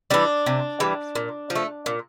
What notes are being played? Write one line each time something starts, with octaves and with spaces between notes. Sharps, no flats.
E3 G3 D4
C3
E3 G3
A#2
F3
A3
A#2